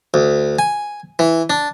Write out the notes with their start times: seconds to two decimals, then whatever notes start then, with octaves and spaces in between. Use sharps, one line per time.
0.14 D2
0.59 G#5
1.19 E3
1.50 D4